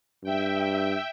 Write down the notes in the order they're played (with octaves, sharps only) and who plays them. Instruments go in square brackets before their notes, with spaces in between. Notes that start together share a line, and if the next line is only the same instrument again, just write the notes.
[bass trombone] G2 [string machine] E5 G5